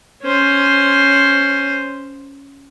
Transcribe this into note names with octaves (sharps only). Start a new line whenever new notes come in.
C#4 C5